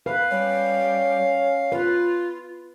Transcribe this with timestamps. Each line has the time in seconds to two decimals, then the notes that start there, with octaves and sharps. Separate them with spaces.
0.06 B4 F5
0.31 G3 C#4
1.72 F4 B4